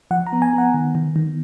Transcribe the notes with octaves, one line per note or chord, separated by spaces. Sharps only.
F3 F#5
A#5
B3
G#5
B3
F#5
D#3
D#3
D#3